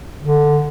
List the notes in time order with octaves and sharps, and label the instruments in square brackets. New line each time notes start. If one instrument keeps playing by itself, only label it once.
[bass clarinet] D3